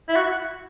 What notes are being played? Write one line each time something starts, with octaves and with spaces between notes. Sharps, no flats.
E4
F#4